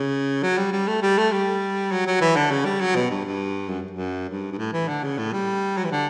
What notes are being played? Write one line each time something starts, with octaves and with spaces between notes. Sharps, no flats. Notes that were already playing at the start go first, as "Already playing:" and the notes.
Already playing: C#3
F#3
G3
G3
A3
G3
A3
G3
F#3
F#3
E3
D3
C#3
G3
F#3
B2
G2
G2
F#2
F#2
G2
G2
A2
E3
D3
C#3
A2
G3
F#3
E3
D3